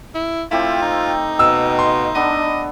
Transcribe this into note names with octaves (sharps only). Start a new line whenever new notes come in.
E4
A3 C4 E4 F4 G4
D#4
B2 F5 E6
C6
B3 D4 A4 D#5